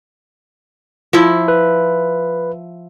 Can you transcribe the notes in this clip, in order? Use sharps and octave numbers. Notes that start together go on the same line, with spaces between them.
F3 E4
B4